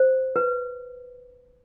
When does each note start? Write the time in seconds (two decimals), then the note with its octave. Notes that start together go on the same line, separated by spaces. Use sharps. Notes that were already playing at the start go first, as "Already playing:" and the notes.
Already playing: C5
0.36 B4